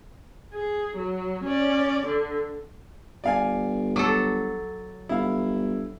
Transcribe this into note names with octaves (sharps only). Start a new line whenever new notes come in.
G#4
F#3
C#4 D5
D3
G1 D5 F5 G#5
F#3 A4 D6
G1 E4 F5